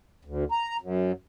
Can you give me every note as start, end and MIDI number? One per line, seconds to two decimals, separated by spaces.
0.25 0.44 38
0.51 0.77 82
0.81 1.12 42